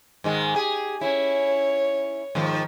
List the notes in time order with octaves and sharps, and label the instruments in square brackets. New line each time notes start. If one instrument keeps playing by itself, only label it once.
[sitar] G#2 D#3 G#3
G4 G#4
[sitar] C#4 E4 [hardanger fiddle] C#5
[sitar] G#2 D#3 F3